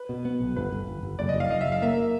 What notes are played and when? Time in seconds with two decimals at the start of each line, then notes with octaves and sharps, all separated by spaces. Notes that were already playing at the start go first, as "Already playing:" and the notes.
Already playing: B4
0.09 B2
0.25 B3
0.40 B1
0.56 G1 B4
0.72 G1
0.87 G1
1.03 G1
1.19 F#1 D5
1.29 D#5
1.34 F#1
1.40 F5
1.50 F#1 D#5
1.61 E5
1.66 F#1
1.72 F5
1.82 A#3 E5